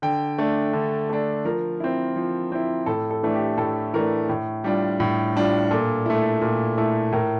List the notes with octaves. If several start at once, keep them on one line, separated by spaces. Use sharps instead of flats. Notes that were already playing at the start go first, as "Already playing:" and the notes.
D3 G5
A3 D4
D3
A3 D4
F3 A#4
C4 E4
F3
C4 E4
A2 A4
A4
E3 A3 D4
G4
A2 A4
E3 A3 D4 A#4
A2
G3 D4 F4
A2
G3 D4 F4
A#2 A4
A3 E4
A#2
A3 E4
A2 A#4